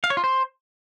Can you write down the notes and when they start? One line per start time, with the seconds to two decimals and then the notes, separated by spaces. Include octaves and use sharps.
0.04 F5
0.10 C#5
0.17 F4
0.24 C5